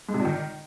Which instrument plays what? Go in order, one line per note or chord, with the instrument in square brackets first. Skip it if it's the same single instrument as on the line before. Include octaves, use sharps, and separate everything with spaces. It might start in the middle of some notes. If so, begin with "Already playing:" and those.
[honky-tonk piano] G#2
C3
A#2
D#3